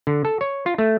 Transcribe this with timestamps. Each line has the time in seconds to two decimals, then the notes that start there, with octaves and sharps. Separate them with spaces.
0.07 D3
0.25 A4
0.41 C#5
0.66 F4
0.78 A3